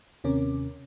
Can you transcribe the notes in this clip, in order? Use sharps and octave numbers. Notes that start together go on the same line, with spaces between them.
D#2 C3 C#4 A#4 D6